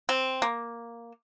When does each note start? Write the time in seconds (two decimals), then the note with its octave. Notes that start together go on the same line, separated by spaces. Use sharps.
0.09 C4
0.42 A#3